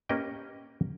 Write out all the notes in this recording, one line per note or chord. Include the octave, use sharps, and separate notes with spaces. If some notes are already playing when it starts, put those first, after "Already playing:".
A#3 C#4 G4 B4 D#5 G5